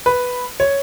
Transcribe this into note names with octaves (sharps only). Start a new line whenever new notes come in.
B4
C#5